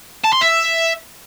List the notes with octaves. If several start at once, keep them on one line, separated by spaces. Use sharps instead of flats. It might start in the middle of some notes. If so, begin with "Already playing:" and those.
A5
C6
E5